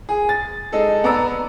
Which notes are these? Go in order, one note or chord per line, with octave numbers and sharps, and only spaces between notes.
G#4
A6
G#3 D#4 A4
B3 D5 A#5 E6